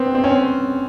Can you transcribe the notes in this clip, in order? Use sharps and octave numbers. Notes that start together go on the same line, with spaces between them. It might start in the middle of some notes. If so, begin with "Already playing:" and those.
Already playing: B3 C4
C4
C#4
C4